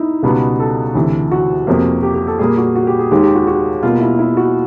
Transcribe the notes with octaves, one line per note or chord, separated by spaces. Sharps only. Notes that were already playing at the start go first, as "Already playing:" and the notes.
Already playing: D#4 E4
C#2 B2 G3 B3
A4
D2 C3 E3
F#4
F2 C3 F3 A#3
G4
G4
A4
A#2 G3 A#3 G#4
F#4
F#4
G4
G#4
D#2 D#3 G#3 G4
G4
F#4
F#4
B2 G3 A#3 F4
E4
E4
F#4